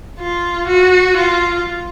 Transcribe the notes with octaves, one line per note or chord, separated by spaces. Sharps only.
F4
F#4
F4